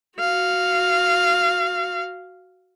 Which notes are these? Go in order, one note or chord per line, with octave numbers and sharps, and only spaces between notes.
F#4 F5